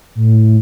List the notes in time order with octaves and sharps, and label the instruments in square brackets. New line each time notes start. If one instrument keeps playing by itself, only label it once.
[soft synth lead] A2